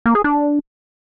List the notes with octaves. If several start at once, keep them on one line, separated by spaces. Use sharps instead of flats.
A#3
G#4
D4